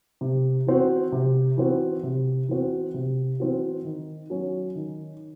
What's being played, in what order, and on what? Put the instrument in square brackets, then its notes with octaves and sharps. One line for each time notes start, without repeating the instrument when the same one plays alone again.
[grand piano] C3
E3 C4 F#4
C3
E3 C4 F#4
C3
E3 C4 F#4
C3
E3 C4 F#4
D#3
F#3 C#4
D#3